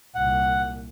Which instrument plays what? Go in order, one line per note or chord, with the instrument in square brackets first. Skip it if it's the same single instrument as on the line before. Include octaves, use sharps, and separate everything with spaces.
[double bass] C2 A#2 [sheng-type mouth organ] F#5